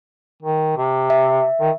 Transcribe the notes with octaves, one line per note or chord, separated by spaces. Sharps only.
D#3
C3
E5
D#3